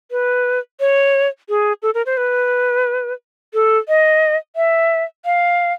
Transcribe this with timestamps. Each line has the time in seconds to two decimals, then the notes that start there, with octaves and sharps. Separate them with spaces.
0.11 B4
0.80 C#5
1.49 G#4
1.82 A4
1.94 A#4
2.06 C5
2.17 B4
3.54 A4
3.88 D#5
4.56 E5
5.25 F5